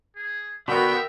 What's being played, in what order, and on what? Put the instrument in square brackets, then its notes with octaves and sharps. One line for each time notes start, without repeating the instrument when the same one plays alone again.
[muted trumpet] G#4
[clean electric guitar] D3 B3 [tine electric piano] F#4 B5 [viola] A#4 G5 [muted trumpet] E5